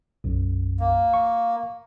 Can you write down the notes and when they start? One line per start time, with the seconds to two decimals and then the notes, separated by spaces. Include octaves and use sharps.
0.24 B1 F#2
0.80 A#3
1.14 C#6